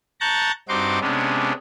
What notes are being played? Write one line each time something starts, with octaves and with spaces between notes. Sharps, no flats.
A5 A#5 C#6 F#6 G6 A6
G2 C4 D#4 F#4 C6 D6
C3 G#3 B3 C#4 D4